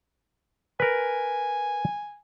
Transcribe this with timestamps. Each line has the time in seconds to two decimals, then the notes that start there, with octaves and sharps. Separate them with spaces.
0.80 A#4 B4 G#5